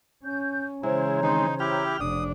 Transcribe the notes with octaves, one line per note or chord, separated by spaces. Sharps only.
C#4 G6
C#3 E3 G#3 E4 C5 C#5 A#5
D#3 G#3 C4 D#4
E4 G4 G5 F6
F1 D4 D#6